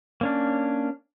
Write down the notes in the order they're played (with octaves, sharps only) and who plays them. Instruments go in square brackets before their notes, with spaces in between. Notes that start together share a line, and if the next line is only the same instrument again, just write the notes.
[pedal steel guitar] A#3 C#4 D4